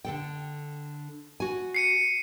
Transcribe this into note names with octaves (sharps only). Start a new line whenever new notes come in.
D3 A4 G5
F#4 G#5
C7 C#7 D#7